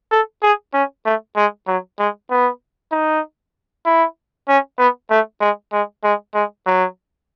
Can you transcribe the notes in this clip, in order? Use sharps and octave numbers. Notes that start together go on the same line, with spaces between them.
A4
G#4
C#4
A3
G#3
F#3
G#3
B3
D#4
E4
C#4
B3
A3
G#3
G#3
G#3
G#3
F#3